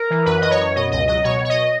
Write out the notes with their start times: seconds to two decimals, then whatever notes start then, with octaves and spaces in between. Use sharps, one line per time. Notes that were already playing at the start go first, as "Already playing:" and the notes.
Already playing: A#4
0.10 E3
0.26 F#2 B4
0.41 F#2 D#5
0.51 C#5
0.60 F#2
0.76 B2 D#5
0.92 C#2 D#5
1.08 F#3 D#5
1.24 B2 C#5
1.40 B2 C#5
1.49 D#5